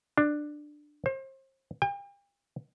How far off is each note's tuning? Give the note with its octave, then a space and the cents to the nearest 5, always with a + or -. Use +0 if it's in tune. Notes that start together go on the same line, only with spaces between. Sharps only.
D4 +15
C5 +35
G5 +40